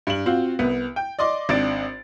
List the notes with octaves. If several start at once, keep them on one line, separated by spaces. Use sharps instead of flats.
G2 F#7
C4 F4 F#4
C2 B3
G5
D5 D#5 C6 D6
G#1 C4 D4 A6 D7